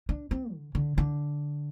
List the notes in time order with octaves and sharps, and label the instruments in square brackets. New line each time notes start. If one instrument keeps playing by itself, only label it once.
[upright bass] D4
C4
D3
D3
D3